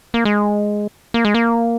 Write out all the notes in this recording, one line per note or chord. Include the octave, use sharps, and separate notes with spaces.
A#3
G#3
A#3
G#3
A#3